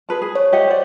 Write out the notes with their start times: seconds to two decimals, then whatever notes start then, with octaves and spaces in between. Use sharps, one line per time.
0.09 G#4 B4 A5
0.22 G#4
0.35 C#5
0.52 G4 D#5 F#5
0.68 C5 D5